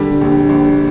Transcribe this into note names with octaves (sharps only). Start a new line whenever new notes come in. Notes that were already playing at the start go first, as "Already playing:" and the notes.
Already playing: D3 G3 G4
A#1
A#1